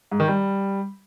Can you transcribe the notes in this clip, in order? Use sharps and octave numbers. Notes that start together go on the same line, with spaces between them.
G#2
D#3
G3